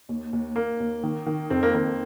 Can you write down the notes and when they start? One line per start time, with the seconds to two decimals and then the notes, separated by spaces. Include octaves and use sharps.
0.09 D#2
0.33 D#2
0.56 D#2 A#3
0.80 D#2
1.03 D#3
1.26 D#3
1.50 F2 C4
1.63 A#3
1.74 D#3 A#3